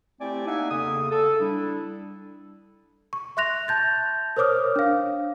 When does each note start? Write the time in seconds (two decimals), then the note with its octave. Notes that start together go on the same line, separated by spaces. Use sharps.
0.21 A3 C4 E4 G4 D5 G#5
0.47 A#3 D#4 E5 F#5 G#5
0.71 E2 C#3 A#3 A4 D#6
1.12 A4
1.40 G3 D4 E4
3.13 C#6
3.37 E5 C6 F#6 A#6 F7
3.68 A5 G6 A6
4.37 A#4 C5 C#5 D6 D#6 F6
4.76 D4 F5